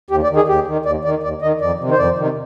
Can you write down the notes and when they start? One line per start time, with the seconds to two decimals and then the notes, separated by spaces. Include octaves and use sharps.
0.11 D#2 G4
0.23 D5
0.30 D#3
0.36 G#4
0.48 D#2 G4
0.67 D#3
0.85 D#2 D5
1.05 D#3 D5
1.23 D#2 D5
1.42 D#3 D#5
1.61 F2 D5
1.80 C3 D#3
1.91 C5
1.99 F2 D5
2.18 C3 D#3